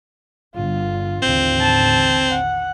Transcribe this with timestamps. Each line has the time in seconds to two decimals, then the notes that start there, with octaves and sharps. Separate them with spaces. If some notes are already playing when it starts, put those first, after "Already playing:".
0.55 G1 D3 F4
1.22 A1 D#2 D3 C4
1.60 A5
2.29 F#5